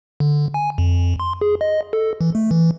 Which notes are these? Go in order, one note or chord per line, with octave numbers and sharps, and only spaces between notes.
D3
G#5
F2
C6
G#4
D#5
A4
E3
A3
E3